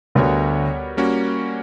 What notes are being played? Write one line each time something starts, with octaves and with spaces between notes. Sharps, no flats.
D2 D3 G3 B3 F#4 A#4 C#5
G3 A#3 C#4 F#4